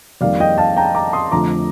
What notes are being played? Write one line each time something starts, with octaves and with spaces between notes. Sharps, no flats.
F2 D#3 G3 A#3 D5 F5
D#5 G5
F5 A5
G5 A#5
A#5 D6
C6 D#6
F2 D3 F3 A3 A#5 D6